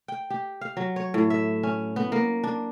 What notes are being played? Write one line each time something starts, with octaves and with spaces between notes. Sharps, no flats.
G5
G4
F5
F#3
C#5
A2
E5
C#4
B3
A#3
D4